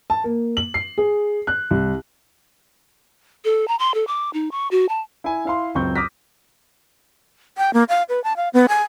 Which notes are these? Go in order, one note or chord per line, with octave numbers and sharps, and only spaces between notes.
A5
A#3
F#7
C7
G#4
F#6
C2
A4
A#5
C6
A4
D6
D#4
C#6
F#4
A5
E4 G#5
E4 F5 C6
C#2 F#2 C4 C#6 G6
D6 D#6 F6 A#6 B6
G5
A#3
F5
B4
A5
F5
B3
G#5